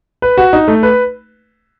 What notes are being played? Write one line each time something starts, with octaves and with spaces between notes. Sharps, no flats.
B4
F#4
D#4
A3
B4